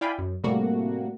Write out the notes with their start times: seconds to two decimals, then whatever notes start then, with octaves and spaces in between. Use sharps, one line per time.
0.01 E4 D5 F5 G5 G#5 B5
0.18 F#2
0.44 A2 C3 G3 A3 A#3 F#4